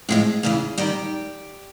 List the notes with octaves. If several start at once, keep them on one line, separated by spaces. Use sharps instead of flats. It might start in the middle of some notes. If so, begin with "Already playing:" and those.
A2 F3 G#3 G#4
E2 C#3 E3
D#3 G3 G4